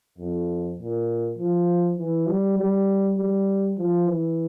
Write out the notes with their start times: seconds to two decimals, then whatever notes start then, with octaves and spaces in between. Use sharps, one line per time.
0.18 F2
0.78 A#2
1.38 F3
1.98 E3
2.28 G3
2.58 G3
3.18 G3
3.78 F3
4.08 E3